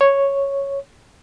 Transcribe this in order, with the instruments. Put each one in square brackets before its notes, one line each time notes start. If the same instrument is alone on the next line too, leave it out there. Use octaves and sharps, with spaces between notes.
[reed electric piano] C#5